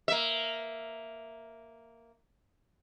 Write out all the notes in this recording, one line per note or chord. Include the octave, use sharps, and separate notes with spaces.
A#3 E5